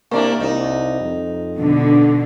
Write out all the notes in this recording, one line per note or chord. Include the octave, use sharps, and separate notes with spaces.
C3 A#3 D4 E4
C2 D#4
F2
B2 D3